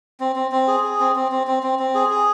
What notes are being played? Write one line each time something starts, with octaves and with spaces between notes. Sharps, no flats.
C4
C4
C4
G#4
G#4
C4
C4
C4
C4
C4
C4
G#4
G#4